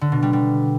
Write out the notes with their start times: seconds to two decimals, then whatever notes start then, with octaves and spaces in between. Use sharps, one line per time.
0.01 D3
0.12 B2
0.22 G3
0.33 G3